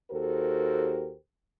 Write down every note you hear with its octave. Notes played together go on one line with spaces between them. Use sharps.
D#2 F#4 G4 A4 A#4 C5